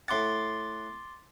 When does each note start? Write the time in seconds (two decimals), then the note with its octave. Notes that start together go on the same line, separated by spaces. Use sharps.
0.08 A2 F#5 C6 D6 A6